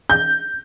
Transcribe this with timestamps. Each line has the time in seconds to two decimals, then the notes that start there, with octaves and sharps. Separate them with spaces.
0.10 G6